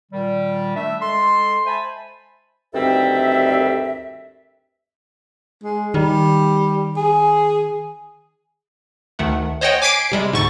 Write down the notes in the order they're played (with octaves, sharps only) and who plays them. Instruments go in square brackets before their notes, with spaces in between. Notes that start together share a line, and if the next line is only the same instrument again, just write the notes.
[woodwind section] A#2 D#3 G3
A3 D4 E5
G#3 A4 C6
C5 E5 G#5 A5 B5
D2 G2 D#3 C4 A4 E5
[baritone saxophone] G#3
[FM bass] D#3 [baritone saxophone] G3
[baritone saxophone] G#4
[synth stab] D2 D#3 A3 F#5
C5 C#5 D#5 F#5 G5
G#5 D6 G#6 B6 C7 D7
C3 G3 G#3
D2 G#2 D3 C#6 A6